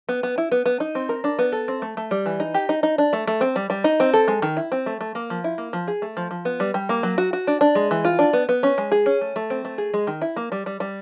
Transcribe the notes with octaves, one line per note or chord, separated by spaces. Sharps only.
B3
B3
E4
B3
B3
D#4
C4
A#4
D4
B3
A4
C4
A3
A3
G3
E3
D#4
G4
D#4
D#4
D4
A3
A3
C4
G3
G3
D#4
C4
A4
G#3
D#3
E4
C4
A3
A3
A#3
F3
E4
A#3
F3
G#4
A3
F3
F3
B3
G3
G3
A#3
F#3
F#4
F#4
D4
D4
G#3
E3
F4
D4
B3
B3
C#4
G#3
G#4
C#4
A3
A3
C4
A3
G#4
G#3
D#3
E4
A#3
G3
G3
G3